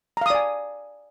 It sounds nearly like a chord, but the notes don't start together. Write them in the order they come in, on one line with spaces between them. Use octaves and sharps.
A#5 F5 D#6 D5 G#5